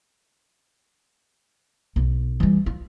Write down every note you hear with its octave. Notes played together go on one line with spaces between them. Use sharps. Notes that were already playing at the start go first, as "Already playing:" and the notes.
B1
E3 G3
F4